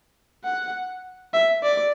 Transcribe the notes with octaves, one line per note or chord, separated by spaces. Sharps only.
F#5
E5
D5